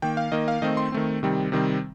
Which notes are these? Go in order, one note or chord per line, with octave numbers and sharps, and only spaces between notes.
D#3 A#3 G5
F5
D#3 A#3 D#5
F5
D#3 A3 C4 D#5
C6
D#3 A3 C4
C3 D#3 G3 C4
C3 D#3 G3 C4